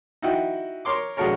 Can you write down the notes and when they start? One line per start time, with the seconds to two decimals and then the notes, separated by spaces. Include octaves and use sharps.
0.22 D#4 E4 F#4 G5
0.85 A#4 C#5 C6 D6
1.17 A#1 G#3 F#4 A4 A#4 C#5